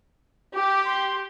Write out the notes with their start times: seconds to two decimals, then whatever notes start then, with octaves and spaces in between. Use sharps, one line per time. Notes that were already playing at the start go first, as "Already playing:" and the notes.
0.55 G4 D6
0.85 C6